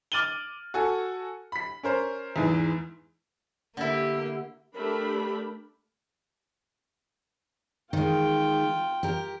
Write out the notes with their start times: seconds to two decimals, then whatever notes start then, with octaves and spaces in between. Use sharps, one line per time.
0.12 D6 F6 A6 D#7 F#7 G7
0.74 F#4 A4 G#5
1.52 B5 B6
1.83 C#4 A#4 C5
2.36 E2 G#2 E3
3.77 D3 A#3 E4 G4
4.75 A3 D4 G4 A#4 B5
7.93 D#3 G#3 F4 G5
9.03 G4 A#4